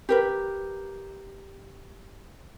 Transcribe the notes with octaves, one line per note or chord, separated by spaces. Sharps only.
G4 A#4 B4